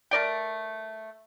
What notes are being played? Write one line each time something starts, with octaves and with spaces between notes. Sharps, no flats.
A3 A#4 D5 G5